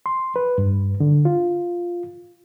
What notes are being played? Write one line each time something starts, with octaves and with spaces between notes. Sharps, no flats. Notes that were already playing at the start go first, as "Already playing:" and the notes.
C6
B4
G2
D3
F4